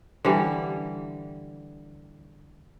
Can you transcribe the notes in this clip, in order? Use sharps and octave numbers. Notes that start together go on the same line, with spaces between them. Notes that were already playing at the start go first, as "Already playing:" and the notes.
D3 E3 G3